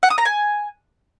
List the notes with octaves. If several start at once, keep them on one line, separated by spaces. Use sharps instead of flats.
F#5
D#6
A#5
G#5